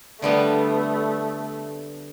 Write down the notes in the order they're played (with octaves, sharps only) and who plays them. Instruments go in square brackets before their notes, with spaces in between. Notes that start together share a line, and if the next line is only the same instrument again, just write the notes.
[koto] D3 G3 B3 [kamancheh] A3